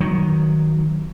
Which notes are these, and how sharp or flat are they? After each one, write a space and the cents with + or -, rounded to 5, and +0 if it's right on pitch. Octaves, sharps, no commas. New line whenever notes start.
D#3 +0 F#3 +0